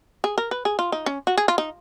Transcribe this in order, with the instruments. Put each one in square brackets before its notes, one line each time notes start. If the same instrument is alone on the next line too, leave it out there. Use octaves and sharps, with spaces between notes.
[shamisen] G#4
A#4
B4
G#4
F4
D#4
C#4
F#4
G#4
F4
D#4